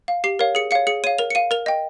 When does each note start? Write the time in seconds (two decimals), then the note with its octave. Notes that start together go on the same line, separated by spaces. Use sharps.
0.08 F5
0.24 G4 C7
0.39 A#4 C#5 F5
0.55 G#4 C#7
0.71 C#5 F5 C#7
0.87 G#4 C#7
1.04 C#5 F5 D#7
1.18 A#4 F7
1.30 C#7
1.35 F5 D#7
1.51 A#4 F7
1.66 D#5 G5